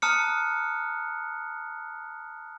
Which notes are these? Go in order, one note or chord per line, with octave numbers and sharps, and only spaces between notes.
A5 A#5 D#6 F6 F#6 C#7